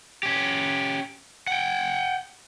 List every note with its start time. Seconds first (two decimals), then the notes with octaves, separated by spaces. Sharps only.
0.23 C#4 G4
1.47 F#5 G5